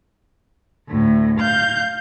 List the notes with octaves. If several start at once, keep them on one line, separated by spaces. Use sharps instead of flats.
D2 A2
F5 G6